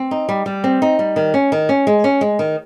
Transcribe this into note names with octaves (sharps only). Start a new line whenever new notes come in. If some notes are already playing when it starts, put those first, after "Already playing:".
Already playing: C4
D#4
G3
G3
C4
D#4
G3
D#3
C#4
D#3
C#4
G#3
C#4
G#3
D#3